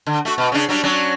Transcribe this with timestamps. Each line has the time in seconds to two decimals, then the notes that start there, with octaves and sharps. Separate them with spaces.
0.07 D3
0.25 A3 F#4
0.38 B2
0.52 C#3 D4
0.69 F#3 G3 D4
0.83 F#3 C#4 D4